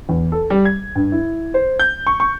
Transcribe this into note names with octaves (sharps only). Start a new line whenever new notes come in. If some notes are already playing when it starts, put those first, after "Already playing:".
E2
A4
G3
G#6
G2
E4
C5
G6
C#6
C#6